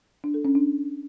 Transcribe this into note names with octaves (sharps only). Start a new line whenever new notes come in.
D4
A4
C#4
D4